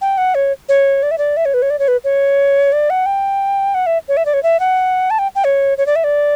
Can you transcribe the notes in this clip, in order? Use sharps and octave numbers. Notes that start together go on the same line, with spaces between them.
G5
F#5
C#5
C#5
D5
E5
D5
E5
C#5
B4
C#5
D5
C#5
B4
C#5
D5
F#5
G5
F#5
E5
C#5
E5
D5
C#5
E5
F#5
A5
G5
G5
C#5
C#5
D5
E5
D5